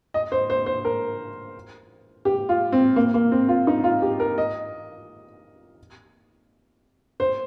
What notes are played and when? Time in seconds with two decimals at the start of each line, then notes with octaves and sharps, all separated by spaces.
0.14 D#5
0.32 C5
0.50 C5
0.66 C5
0.85 A#4
2.25 G4
2.49 F4
2.72 C4
2.96 A#3
3.14 A#3
3.32 C4
3.48 F4
3.67 D#4
3.84 F4
4.02 G4
4.20 A#4
4.38 D#5
7.20 C5